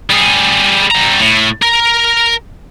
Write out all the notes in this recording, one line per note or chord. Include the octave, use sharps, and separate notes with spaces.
G3 G#4
G3 A#5
A2
A#4